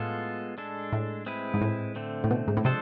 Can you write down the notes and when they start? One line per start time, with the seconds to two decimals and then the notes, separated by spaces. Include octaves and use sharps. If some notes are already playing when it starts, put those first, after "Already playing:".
Already playing: A2 G#3 B3 F4 A4
0.58 G#3 D4 A4
0.93 A2
1.26 G#3 C4 E4 B4
1.54 G#2
1.61 A2
1.96 D3 A3 C4
2.24 A2
2.31 B2
2.48 G#2
2.57 A2
2.65 C3 F3 G#3 D4 A4 C5